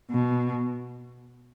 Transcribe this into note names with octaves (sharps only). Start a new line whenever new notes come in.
B2